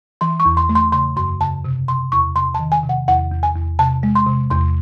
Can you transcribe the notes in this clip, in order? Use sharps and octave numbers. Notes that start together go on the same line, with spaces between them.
E3 C6
C#6
E2
C6
A3
C6
C#3 C6
F#2 C6
C#3 A5
C3
C3 C6
E2 C#6
C3 C6
D#3 A5
G#5
C3
F#5
E2 F#5
E2
G#5
E2
C3 A5
G#3
C6
C3
E2 C6